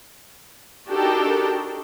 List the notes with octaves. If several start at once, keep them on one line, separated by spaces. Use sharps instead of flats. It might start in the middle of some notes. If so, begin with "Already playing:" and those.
D4 D#4 F#4 G4 A4 A#4